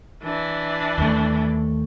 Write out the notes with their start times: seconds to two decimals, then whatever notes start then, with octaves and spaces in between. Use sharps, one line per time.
0.23 E3 D4
0.98 D#2 A3